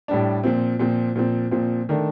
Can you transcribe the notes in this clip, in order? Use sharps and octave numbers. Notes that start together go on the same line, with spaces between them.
A2 G3 D4
A#2 F3 C4
A#2 F3 C4
A#2 F3 C4
A#2 F3 C4
D#3 A3 D4